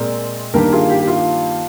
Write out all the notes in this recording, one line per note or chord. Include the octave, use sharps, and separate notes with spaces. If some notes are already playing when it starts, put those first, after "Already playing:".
Already playing: A#2 G#3 C4 A#4 D5
G2 D#3 G3 A#3 G4 A#4
F4 G#4
G4
G4
F4